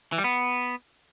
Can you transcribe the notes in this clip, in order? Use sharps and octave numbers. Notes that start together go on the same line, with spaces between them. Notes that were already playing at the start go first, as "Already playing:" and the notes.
E3
G3
B3